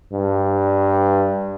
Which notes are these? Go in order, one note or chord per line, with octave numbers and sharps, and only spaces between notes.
G2